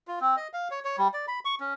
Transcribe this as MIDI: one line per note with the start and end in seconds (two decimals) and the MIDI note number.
0.08 0.19 65
0.21 0.36 60
0.37 0.48 75
0.53 0.68 77
0.71 0.80 73
0.85 0.96 73
0.98 1.08 55
1.14 1.26 74
1.28 1.40 83
1.45 1.55 85
1.60 1.74 61